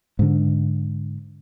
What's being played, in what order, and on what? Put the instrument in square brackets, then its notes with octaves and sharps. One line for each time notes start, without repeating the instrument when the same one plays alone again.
[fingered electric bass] G#2 D3